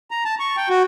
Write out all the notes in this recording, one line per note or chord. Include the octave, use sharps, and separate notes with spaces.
A#5
A5
C#6
G5
F#4